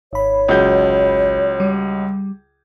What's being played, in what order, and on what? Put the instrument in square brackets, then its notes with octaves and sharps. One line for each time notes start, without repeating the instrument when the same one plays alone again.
[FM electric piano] G#1 B5 [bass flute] C#5
[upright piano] C#2 F#3 G6
[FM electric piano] G3